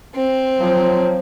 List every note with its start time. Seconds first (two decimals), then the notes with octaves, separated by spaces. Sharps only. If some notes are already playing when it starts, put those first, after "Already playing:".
0.15 C4
0.59 F3 F#3